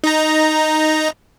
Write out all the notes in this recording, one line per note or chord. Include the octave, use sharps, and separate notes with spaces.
D#4 A#5